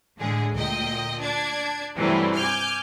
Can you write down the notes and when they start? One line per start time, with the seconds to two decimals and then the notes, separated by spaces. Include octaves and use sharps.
0.19 A2 D3 G#3 G#4
0.54 D2 A#2 D#5 G5
1.21 D4 G#6
1.95 G2 C3 E3 F#3 G3 A3
2.36 G#5 D6 F6 G6